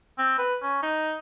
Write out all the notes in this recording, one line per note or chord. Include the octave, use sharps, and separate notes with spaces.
C4
B4
C#4
D#4